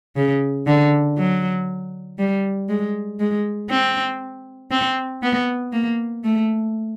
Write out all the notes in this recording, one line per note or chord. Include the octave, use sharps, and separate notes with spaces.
C#3
D3
F#3
G3
G#3
G#3
C4
C4
B3
A#3
A3